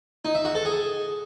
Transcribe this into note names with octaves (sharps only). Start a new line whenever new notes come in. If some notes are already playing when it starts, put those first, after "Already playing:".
D#4
E5
F#4
A4
G#4